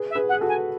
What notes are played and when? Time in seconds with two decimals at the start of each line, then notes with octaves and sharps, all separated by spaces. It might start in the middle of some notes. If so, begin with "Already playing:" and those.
Already playing: G#4 B4
0.10 E5
0.15 G#4 B4
0.28 F#5
0.33 G#4
0.41 F#4 A4
0.48 G#5